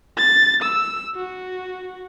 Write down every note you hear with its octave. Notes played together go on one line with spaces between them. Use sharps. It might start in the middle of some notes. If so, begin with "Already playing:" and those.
A6
E6
F#4